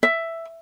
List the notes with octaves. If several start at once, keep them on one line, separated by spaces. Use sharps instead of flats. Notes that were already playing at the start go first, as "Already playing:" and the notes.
E5